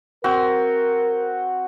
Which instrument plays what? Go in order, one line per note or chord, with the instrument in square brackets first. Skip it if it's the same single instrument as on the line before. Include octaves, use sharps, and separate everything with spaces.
[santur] C4 F#4 [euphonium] A#4